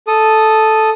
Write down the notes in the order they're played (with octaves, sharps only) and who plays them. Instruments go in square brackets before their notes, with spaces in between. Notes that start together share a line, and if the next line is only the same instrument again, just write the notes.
[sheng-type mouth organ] A4 D#6